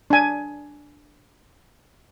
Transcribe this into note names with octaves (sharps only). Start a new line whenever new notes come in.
D4 G#5